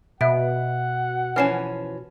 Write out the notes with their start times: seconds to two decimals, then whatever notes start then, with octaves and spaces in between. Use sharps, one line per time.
0.21 B2 E5 F#5 D7
1.36 E3 F3 C#4 F6 C7 E7